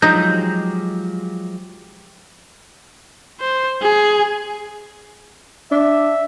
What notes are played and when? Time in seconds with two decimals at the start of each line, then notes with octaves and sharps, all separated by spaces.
0.02 F3 F#3 G#3 D#4 G4 G6
3.40 C5
3.82 G#4
5.71 D4 E5